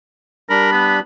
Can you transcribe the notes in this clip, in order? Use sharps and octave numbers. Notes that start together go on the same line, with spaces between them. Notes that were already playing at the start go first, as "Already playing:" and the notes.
G3 D4 A#4 B5
B3